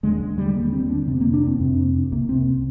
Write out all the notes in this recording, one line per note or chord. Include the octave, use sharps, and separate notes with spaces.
D#2 D3 G#3
G#3
G3
D#2 D3 A#3
C4
D4
F2 C3 C4
A#3
D4
C4
F2 C3
C2 C3 A#3
C4